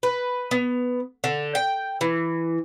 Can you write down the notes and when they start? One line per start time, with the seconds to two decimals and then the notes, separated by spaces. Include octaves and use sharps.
0.03 B4
0.51 B3
1.24 D3
1.55 G5
2.01 E3